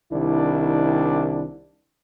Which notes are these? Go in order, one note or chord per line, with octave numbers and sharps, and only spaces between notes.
C2 D#3 D4 E4